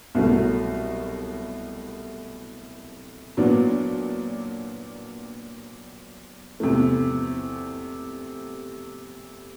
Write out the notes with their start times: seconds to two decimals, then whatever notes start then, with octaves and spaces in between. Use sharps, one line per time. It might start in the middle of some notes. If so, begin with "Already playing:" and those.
0.15 C2 B2 F#3 A3
3.37 A#2 F#3 B3 D4
6.60 E2 C3 F3 A3